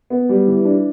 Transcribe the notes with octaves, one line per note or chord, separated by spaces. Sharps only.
B3
G3
E3
D4